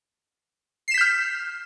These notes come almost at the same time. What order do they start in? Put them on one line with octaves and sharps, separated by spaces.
C7 E7 B6 G6 F6